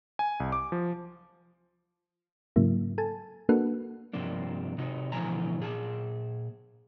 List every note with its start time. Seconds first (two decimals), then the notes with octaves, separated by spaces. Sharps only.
0.19 G#5
0.40 C2
0.52 D6
0.72 F3
2.56 G#2 C#3 F#3 A#3 E4
2.98 A4 G#5 A5
3.49 A#3 D4 F#4 A4 B4 F#5
4.13 G2 C3 F3 A#3 D4
4.78 C3 D#4 F#4
5.12 B2 D3 E3 F3 G#5 A#5
5.59 A#2 G#4 A5